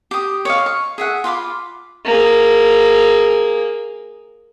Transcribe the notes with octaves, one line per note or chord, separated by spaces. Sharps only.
G4 D#6
C#5 D#5 F5
C#6
G#4 E5 F#5
F4 F5 B5 D6
A#3 G#4